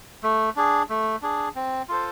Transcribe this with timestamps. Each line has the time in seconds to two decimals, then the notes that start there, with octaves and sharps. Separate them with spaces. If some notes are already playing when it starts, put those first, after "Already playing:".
0.23 A3
0.56 D4 G#4
0.90 A3
1.22 D4 G#4
1.56 C4
1.89 F4 A4 C5